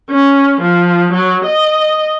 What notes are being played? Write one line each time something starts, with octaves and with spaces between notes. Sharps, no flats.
C#4
F3
F#3
D#5